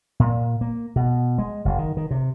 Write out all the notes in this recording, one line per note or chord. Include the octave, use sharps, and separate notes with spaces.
A#2
A#3
B2
G#3
F#1
D#3
D#3
C3